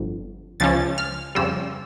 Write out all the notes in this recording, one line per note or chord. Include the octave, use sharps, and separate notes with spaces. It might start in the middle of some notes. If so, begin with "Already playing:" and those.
Already playing: G1 F2 D3
C#2 C#3 F3 C#4 A6
F6
F2 C#3 G3 E6